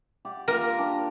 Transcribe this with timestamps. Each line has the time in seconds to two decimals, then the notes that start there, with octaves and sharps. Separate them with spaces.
0.25 G4 D5 F#5
0.48 A#3 F4 G4 A#4
0.78 D4 G4